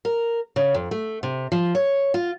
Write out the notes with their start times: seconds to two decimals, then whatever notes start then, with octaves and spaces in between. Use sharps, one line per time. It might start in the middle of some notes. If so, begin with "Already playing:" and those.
0.05 A#4
0.56 C#3
0.74 F2
0.91 A3
1.23 C3
1.52 F3
1.75 C#5
2.14 F4